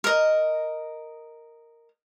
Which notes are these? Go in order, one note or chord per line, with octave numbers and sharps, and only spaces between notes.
A#4 D#5